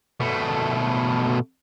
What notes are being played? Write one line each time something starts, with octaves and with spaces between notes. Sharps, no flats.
B2 A3